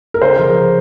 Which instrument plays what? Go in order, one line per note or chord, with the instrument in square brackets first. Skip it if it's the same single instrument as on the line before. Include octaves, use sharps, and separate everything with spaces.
[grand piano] A#4
[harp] C#2 [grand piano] C5
[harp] C#3 F3 [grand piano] A#4